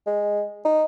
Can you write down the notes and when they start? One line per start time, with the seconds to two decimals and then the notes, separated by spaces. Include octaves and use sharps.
0.06 G#3
0.65 D#4